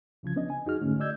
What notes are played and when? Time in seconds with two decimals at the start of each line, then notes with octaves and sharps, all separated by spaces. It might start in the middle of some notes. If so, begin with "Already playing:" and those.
0.23 C2 C#3 F3 G#6
0.36 B3 C#4 D4 D#5
0.50 G#5
0.66 F2 D#4 F#4 G#4 F6
0.81 G#2 D3 A3 C#4
1.00 D5 D#5 E6 G6 G#6